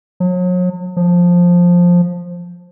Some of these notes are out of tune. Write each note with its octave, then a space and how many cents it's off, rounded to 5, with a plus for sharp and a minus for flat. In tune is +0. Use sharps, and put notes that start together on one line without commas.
F#3 -40
F3 +10